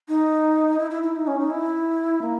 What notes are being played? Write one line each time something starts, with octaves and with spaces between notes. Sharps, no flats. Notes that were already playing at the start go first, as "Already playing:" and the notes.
D#4
E4
E4
E4
D#4
C#4
D#4
E4
A#3